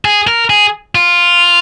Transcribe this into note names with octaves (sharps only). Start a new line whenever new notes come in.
G#4
A#4
G#4
F4